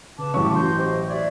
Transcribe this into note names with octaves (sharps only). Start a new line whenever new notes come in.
C#3 B4 A5 D6
A1 C#4 C#6
F#3 F#4 C6 G6
G4 C5 D#5
D4 D5 E5 G#6